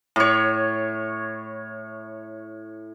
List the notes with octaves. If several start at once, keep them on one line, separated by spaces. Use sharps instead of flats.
A2 C#5